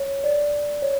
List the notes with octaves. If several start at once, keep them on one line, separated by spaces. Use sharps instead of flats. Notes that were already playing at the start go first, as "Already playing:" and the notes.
Already playing: C#5
D5
C#5